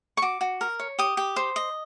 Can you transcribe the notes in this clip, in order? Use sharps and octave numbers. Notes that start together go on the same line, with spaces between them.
C#6
F#4 D6
F#4
A#4
C#5
G4 D#6
G4
C5
D#5